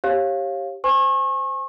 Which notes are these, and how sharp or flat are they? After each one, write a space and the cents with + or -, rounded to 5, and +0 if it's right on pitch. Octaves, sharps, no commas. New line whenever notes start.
G4 -5 C#5 -30 F5 +0
C5 -10 G#5 +0 C#6 -35